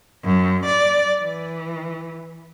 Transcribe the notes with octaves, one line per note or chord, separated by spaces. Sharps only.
F#2
D5
E3